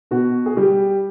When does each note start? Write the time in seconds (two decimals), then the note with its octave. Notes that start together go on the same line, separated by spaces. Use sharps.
0.11 B2 F#4
0.46 G#4
0.57 G3 G4